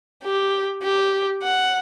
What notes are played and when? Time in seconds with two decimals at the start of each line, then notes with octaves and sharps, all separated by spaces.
0.23 G4
0.82 G4
1.43 F#5